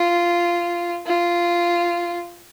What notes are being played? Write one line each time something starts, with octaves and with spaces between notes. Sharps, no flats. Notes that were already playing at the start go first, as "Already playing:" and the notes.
Already playing: F4
F4